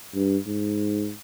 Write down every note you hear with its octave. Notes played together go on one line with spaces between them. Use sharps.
G2
G#2